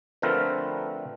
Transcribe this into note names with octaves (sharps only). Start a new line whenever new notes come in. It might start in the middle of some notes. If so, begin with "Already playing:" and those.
D3 F3 A3 C4 A#4 B4